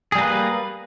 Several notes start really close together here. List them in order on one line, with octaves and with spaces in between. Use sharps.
G#4 G3 A#3 B4